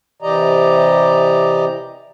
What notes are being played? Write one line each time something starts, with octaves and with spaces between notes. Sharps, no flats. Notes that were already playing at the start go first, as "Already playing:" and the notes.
C3 E3 G4 D5 D#5 A#5